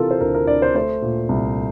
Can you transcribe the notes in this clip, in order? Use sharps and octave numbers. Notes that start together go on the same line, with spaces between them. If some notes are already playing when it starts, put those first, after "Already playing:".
Already playing: C3 E3 F4 A4 A#4
C5
D2 A#4
A#4
D2 D5
C5
A3 C5
A#2
C2